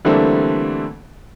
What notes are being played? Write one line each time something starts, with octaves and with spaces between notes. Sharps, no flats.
D3 E3 G3 A3 A#3 C4